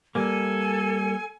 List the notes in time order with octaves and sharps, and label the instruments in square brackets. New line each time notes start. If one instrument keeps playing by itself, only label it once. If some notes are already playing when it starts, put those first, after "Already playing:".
[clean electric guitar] G3 A#3 [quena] A4 [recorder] G#5